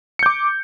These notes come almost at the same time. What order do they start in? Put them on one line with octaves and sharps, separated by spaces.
C#7 G6 D6